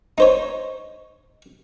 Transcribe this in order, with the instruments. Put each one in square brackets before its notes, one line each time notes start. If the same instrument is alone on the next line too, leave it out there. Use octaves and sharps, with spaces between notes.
[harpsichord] D#4 C5 C#5